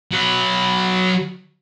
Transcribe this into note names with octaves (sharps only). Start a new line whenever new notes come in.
F#3 B4